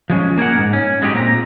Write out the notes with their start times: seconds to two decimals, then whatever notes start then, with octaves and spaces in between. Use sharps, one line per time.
0.10 F3 G#3 C#4
0.38 A#3 G#4 A#4 F#5
0.55 G#2 B2
0.73 C#4
1.02 F#3 G#3 D#4 G4
1.13 A#2 C4 A#5